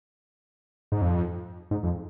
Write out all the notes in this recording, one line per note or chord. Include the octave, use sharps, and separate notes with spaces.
G#2
F2
G#2
F2